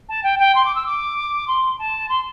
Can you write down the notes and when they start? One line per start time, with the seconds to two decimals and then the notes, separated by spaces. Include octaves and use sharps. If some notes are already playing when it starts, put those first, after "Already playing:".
0.09 A5
0.23 G5
0.39 G5
0.55 C6
0.65 D6
0.75 E6
0.86 D6
1.48 C6
1.79 A5
2.09 C6